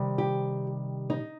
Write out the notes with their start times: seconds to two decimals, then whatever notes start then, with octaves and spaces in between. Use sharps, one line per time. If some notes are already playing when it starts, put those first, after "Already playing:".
Already playing: C3 D#3 G3
0.18 G4
1.10 D#4